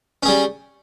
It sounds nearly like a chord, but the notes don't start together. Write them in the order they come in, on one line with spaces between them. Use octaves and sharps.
C#4 G#4 G3